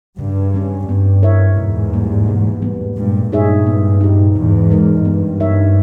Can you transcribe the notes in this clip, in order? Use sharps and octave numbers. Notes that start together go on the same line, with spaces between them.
G2 C#3
G3 C#4
G2 B3
E4 A#4 C#5 E5
E2 G#2 B2
G3 A#3
B2
G3 B3
G2 A#2 G#3
G2 A#2 D#4 G#4 C#5 E5
B3
D#4 G4
E2 G#2 B2
G#3 D#4 A#4
G2 B3
D#4 A#4 C#5 E5